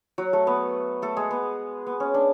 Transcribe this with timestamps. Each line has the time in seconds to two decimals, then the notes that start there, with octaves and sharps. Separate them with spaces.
0.18 F#3 F#4
0.33 A3 A4
0.47 B3 B4
1.02 A3 A4
1.17 G#3 G#4
1.31 B3
1.87 B3
2.00 C#4
2.14 D4